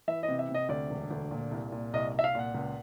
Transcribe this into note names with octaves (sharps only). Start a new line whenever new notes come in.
E3 E5
D#5
C3
E5
C3
D#5
D2 D5
E1
D2
A#2
C2
A#2
C2 D#5
C2
E5
F5
A#2 F#5
C#2